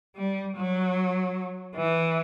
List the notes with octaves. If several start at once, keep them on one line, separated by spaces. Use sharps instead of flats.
G3
F#3
E3